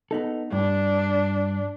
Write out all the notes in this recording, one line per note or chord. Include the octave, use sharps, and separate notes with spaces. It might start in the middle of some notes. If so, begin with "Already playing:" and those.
B3 D#4 A4
G2 D4